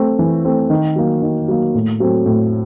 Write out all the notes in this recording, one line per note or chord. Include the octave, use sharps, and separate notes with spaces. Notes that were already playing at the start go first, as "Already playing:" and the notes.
Already playing: A3 C4
E3
A3 C4
D#3
F#3 A#3
D#3
F#3 A#3
A2
F#3 A3 C4
A2